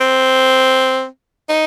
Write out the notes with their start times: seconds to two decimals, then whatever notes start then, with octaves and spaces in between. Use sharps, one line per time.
0.01 C4
1.49 D#4